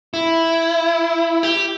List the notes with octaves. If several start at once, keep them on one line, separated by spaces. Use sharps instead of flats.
E4
G4